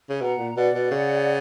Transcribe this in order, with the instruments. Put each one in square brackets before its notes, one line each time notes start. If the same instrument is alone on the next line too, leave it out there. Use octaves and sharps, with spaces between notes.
[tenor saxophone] C#3
[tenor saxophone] B2 [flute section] F#5 A#5
[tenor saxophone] A#2
[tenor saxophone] B2 [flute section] D5 F#5
[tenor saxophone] B2
C#3